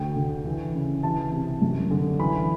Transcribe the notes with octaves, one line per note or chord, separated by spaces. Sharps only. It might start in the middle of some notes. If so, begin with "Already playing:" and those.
Already playing: D2 D3 G5
D3
E3
C#3
E3 A5
C3
F#2
D3
E3 B5